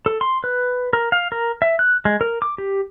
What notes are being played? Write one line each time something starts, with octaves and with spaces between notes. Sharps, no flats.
A4
C6
B4
A#4
F5
A#4
E5
F#6
G#3
A#4
D6
G4